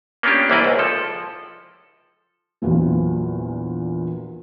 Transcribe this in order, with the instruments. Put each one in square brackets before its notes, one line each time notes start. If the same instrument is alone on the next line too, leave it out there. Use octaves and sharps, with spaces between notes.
[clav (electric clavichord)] A#3 B3 C#4 D4 F4 G4
C2 E3 A#3 E4 D5 D#5
C#2
F3 A4
[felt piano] A#1 E2 A#2 F3 F#3